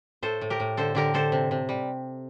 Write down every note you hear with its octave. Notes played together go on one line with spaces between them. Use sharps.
A2 A4 C5
A2
G4 A#4
A2
D3 A4 C5
D3 G4 A#4
D3 A4 C5
C3
C3
G3